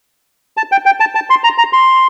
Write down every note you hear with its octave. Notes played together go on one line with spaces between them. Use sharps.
A5
G5
G5
A5
A5
C6
A#5
A#5
C6